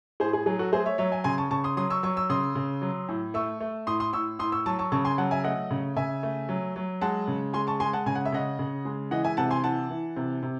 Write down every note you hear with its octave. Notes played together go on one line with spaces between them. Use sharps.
A2 G#4 C5
G#4
F#3 G#4
F#4 A4
A3 G#4 C5
C#5 E5
F#3 C#5 E5
E5 G#5
C#3 G#5 C6
A5 C#6
C#3 A5 C#6
C6 D#6
F#3 C6 D#6
C#6 E6
F#3 C#6 E6
C#6 E6
C#3 C6 D#6
C#3
F#3
A2
A3 C#6 E6
A3
A2 C6 D#6
C6 D#6
A2 C#6 E6
A2 C6 D#6
C#6 E6
F#3 A5 C#6
A5 C#6
C#3 A5 C#6
G#5 C6
F#3 F#5 A5
E5 G#5
A3 D#5 F#5
C#3
C#3 E5 G#5
A3
F#3
F#3
G#3 F#5 A5
C#3
G#3 G#5 C6
A5 C#6
G#3 G#5 C6
F#5 A5
C#3 G#5
F#5
E5
C#3 D#5 F#5
C#3
G#3
E3 D#5 F#5
E5 G#5
C3 F#5 A5
G#5 C6
E3 F#5 A5
E3
C3
C3